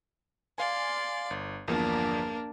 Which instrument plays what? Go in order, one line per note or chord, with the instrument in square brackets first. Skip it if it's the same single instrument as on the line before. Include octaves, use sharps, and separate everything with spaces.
[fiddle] D5 C6 [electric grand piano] F5 G#5
[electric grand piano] G1
[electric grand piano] G1 E2 F3 [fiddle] A#3 D4